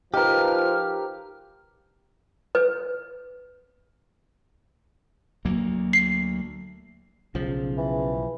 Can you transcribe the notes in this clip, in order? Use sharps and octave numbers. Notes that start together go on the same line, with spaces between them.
F3 D#4 G4 A#4 B4 F6
B4
D2 F#3 A#3
C7
B1 C#3 F3
E3